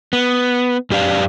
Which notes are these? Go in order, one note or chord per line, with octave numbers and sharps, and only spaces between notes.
B3
F#2 G4 D5 F5